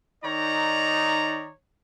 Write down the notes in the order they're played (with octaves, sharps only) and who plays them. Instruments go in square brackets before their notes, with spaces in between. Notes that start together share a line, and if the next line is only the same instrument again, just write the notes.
[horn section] D#3 D#4 C#5 D5 A#5